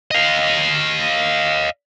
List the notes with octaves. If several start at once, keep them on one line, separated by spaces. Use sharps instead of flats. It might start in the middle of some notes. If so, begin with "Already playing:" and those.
D#5 F5